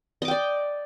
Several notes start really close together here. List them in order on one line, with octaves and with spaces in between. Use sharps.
D#5 D6 G5 D5